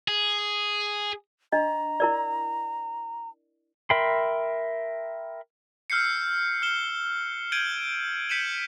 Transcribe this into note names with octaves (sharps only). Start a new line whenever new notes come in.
G#4
D4 D#5 A#5
E4 A#4 D5
A#4 E5 G5 B5 C6
E6 F6 G6 C7 C#7
F6 G6 E7 G7
G6 G#6 D7 D#7 F#7 G7
G6 B6 C#7 D#7 E7 F#7